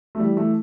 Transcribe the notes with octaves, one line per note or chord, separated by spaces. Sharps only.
A3
E3 G3
E3 A3